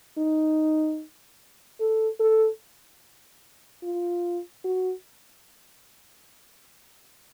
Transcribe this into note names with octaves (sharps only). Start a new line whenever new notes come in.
D#4
A4
A4
F4
F#4